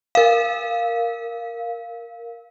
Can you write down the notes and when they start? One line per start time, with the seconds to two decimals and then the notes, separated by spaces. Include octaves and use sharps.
0.15 A#4 F5